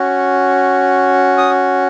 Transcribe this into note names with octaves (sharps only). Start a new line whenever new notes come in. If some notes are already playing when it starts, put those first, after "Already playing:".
Already playing: C#4 F#4
D#6